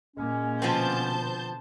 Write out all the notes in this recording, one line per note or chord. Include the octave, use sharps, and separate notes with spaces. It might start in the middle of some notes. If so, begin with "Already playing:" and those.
A#2 G#3 A#3 C#4
B2 D3 F3 B3 C4 C5 A5 G6